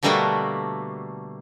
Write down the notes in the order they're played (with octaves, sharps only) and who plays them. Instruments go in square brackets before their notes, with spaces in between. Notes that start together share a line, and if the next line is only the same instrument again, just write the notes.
[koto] B2 D3 G3 A3 A#3 F#4